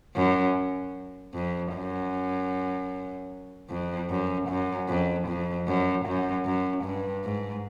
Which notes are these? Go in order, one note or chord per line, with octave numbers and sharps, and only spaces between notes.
F#2
F2
F#2
F2
F#2
F#2
F2
F2
F#2
F#2
F#2
G2
G#2